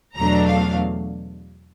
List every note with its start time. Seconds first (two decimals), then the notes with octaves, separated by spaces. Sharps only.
0.16 E2 B2 F#3 A3 D4 A#5
0.47 F5